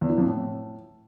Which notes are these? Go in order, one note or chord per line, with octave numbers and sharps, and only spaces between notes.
E2
E3
F2
A2